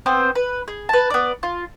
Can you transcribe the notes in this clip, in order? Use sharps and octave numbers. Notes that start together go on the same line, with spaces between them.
B3 C4 C5
B4
G#4
B4 A5
B3 D5
F4